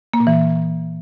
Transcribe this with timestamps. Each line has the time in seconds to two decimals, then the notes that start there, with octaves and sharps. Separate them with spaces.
0.14 A#3
0.20 A#2
0.27 E3